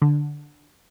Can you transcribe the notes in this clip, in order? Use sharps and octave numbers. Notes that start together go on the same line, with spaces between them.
D3